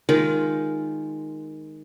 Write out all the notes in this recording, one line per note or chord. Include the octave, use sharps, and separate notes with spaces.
D#3 G#3 F4